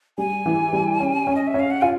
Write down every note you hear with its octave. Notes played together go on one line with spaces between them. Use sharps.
G3 G#5
E3
G3
C#4
C#4
D#5
E5
C#4
F5
F#5
F4 G#5